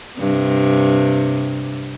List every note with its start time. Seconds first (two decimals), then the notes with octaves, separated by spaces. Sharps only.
0.18 G2 C3